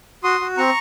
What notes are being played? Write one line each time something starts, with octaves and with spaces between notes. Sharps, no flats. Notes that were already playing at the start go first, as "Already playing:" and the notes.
F#4 C6 D#6
F#4
C4 A#5 C#6